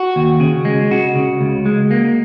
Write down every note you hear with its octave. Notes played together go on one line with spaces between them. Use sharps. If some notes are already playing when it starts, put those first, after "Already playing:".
Already playing: F#4
D#2
C#3
G#3
C#3 F#4
C#3
C#2
G#3
A#3